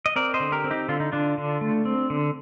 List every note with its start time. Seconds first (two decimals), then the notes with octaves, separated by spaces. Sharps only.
0.06 D#5
0.16 C4 A#4 D5
0.34 C5 D#5
0.40 D3
0.52 G4 A#4
0.64 C4
0.71 D#4 G4
0.88 D3 F4
1.00 D#4
1.12 D3 D4 F4
1.38 D3
1.61 A3
1.85 C4
2.10 D3